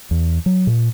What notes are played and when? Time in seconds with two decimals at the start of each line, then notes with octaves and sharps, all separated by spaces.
0.11 E2
0.46 F#3
0.67 A#2